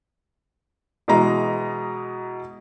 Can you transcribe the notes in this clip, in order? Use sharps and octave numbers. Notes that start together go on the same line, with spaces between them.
B2 E3 G#3 D#5 A#5